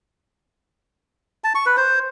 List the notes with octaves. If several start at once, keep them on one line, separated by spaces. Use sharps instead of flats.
A5
C#6
B4
C5